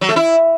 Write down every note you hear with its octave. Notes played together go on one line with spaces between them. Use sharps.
F#3
A3
E4